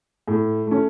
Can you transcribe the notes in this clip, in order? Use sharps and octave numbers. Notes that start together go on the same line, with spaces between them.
A2
A3 C#4